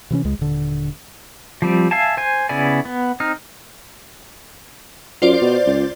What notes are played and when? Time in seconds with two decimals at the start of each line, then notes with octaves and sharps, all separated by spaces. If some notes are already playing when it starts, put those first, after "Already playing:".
0.11 C3 E3 C4 C#4
0.25 C#2 G#3
0.39 D#1 D3
1.62 F3 G3 C4
1.91 E5 F5 G#5 A5
2.17 C5 G#5
2.49 C#3 B3 E4 D5 G#5
2.85 B3
3.20 C4 D#4 F6
5.22 F#2 F4 C5 D5
5.41 B2
5.66 C#2